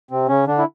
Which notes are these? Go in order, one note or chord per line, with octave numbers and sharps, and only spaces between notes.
C3 C4
C#3 C#4
D3 D4
E4